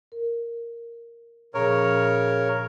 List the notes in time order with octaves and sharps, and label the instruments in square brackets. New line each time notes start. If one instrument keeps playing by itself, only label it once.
[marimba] A#4
[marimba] A#2 F3 [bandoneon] C#3 A#4 C#5